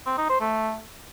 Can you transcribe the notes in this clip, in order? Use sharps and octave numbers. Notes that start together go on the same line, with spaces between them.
C4
D#4
C5
A3